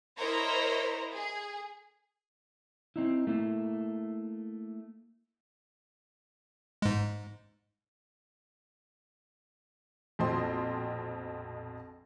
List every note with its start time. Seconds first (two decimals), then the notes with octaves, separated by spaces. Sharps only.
0.17 E4 A#4 C5 C#5 D#5 A#5
1.12 G#4
2.96 C4 D#4 E4
3.27 A3 A#3 E4
6.82 G#2 G#3
10.19 A#1 F2 B2 C4 D#5 C6